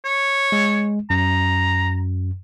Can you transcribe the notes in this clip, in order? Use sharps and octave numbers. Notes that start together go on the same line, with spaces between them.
C#5
G#3
F#2 A#5